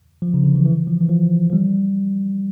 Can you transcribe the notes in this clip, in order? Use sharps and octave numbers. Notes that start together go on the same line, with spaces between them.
F3
C#3
D3
E3
E3
F3
E3
F3
F3
G3